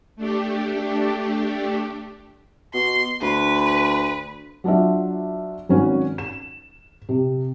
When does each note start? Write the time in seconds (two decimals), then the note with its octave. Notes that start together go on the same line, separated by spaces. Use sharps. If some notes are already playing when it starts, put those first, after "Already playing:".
0.16 A3 D4 G4
2.74 B2 C6
3.22 D2 B4
4.64 F#3 D4 F4 E5
5.69 G#1 C#4 F#4
6.18 E7
7.09 C3